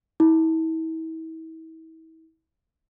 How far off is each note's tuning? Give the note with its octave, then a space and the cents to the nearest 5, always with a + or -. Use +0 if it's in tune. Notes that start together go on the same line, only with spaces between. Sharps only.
E4 -40